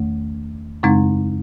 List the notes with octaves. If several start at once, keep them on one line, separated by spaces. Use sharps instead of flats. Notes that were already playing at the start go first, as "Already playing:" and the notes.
Already playing: E2 D#3 A3
F#2 C#3 G#3 C4 D#4